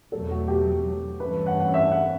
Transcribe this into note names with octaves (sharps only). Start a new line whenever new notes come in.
E2 B2 F#3 A3 A4
F#4
G4
G2 E3 A3 C#4 B4
F#5
F#5
E5
F#5